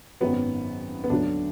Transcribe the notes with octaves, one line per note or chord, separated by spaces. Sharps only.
G#1 F#2 D#3 F#3 B3
B3
D2 D3 F#3 D4